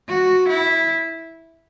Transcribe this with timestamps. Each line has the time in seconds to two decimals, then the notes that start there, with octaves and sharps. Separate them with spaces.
0.09 F#4
0.49 E4